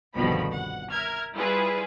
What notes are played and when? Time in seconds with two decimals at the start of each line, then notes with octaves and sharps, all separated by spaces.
0.15 G1 C2 B2 D#3 F3 B5
0.55 F#5
0.91 A#4 E5 F6 G#6
1.35 G3 E4 F4 G#4 B4